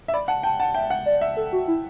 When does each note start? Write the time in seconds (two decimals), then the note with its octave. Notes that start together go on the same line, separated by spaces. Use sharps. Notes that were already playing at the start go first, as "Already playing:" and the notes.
0.08 E5
0.14 D5 B5
0.28 F#5 A5
0.43 G5 A5
0.59 F#5 A5
0.75 E5 G5
0.90 F#5
1.06 D5
1.21 E5
1.37 A4
1.53 F#4
1.68 E4